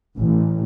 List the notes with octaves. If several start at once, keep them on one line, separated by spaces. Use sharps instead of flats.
A1